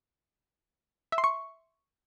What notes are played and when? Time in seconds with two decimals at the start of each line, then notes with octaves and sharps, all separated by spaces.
1.12 E5
1.18 C6
1.24 C#6